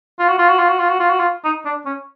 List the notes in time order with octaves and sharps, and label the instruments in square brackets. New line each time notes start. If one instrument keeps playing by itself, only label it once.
[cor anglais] F4
F#4
F4
F#4
F4
F#4
F4
F#4
F4
F#4
F4
D#4
D4
C#4